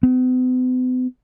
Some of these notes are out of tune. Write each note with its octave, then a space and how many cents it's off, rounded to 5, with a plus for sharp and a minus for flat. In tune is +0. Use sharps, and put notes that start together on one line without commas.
B3 +45